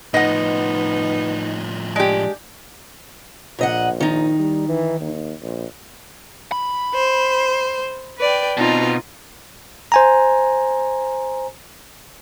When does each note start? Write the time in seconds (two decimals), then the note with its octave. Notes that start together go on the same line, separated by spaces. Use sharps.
0.14 A2 F3 B3 D#4 D#5 F#5
1.96 G#3 D4 G4
3.59 A#1 A#2 D#5 F#5
4.00 D#3 D#4
4.39 G3
4.68 E3
5.01 D#2
5.42 A#1
6.52 B5
6.94 C5
8.18 B4 D5 G5
8.57 B2 C4 D#4 F4
9.92 C5 G#5 A#5